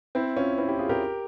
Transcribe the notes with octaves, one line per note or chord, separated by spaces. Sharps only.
C4 E4
C#4 F4
C4 E4
E4 G4
F4 G#4
G4 A#4